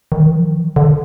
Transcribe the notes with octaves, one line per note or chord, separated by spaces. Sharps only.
D#3
E3
F3
D3